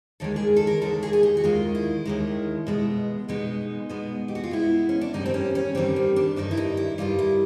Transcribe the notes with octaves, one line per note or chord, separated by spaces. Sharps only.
D#2 D#3 G#3 A4
G#4
A4
A#4
D#2 D#3 G#3 A4
G#4
G#4
G4
F#4
D#2 D#3 G#3 F4
E4
D#2 D#3 G#3
B2 G#3 B3
B2 G#3 B3 D#4
B2 G#3 B3
G4
F#4
F4
B2 G#3 B3 E4
C#4
D4
G2 D#3 G3 D#4
C4
C#4
C#4
G2 D#3 G3 C4
C4
D4
G2 D#3 G3 D#4
E4
D#4
E4
G2 D#3 G3 F4
E4